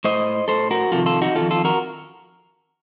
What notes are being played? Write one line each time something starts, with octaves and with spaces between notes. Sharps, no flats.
A2 C5 D#5
A2 A4 C5
F#4 A#4
F2 C3 D#3 F4 A4
F4 A4
D#4 F#4
C3 D#3 F4 A4
F2
F4 A4
F#4 A#4